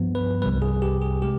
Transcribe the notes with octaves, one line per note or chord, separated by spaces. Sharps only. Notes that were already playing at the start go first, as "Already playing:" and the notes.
Already playing: G2 F3 B3
B4
C2 C3 G3 B4
G#4
G4
G#4
C3 G#3 G4